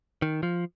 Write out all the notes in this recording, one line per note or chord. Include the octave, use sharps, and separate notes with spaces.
D#3
F3